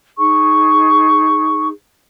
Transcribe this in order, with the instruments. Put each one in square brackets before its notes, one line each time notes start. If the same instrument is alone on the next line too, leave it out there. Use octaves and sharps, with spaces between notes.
[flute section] D#4 G#4 C#6